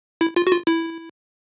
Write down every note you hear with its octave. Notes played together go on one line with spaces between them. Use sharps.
E4
F4
F#4
F4
E4